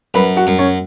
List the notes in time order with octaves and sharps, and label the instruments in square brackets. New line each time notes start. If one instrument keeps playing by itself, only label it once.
[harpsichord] F#2 [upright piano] B4 B5
[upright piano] F#4 F#5
[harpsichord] F#2
[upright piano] C#4 C#5